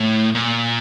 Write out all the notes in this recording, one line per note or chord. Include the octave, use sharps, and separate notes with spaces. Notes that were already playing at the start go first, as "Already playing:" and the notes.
Already playing: A2
A#2